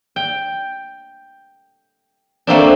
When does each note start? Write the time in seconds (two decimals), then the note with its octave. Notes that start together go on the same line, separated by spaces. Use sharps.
0.16 G5
2.47 A3 A#3 C4 D4